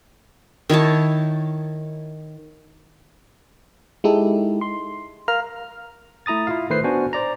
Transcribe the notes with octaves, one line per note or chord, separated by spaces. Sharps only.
D#3 E4 C#5 A5
G#3 D#4 E4 G4 A4
C6
A#4 F5 A#5 F6
A3 E4 A#5 D#6 A6
E4 F4 F5
D#3 A3 B4 C5 C7
B3 D4 F#4 C5 G#5
C5 D5 A#5